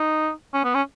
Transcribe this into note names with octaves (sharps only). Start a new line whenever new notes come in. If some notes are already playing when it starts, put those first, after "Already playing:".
Already playing: D#4
C#4
B3
C#4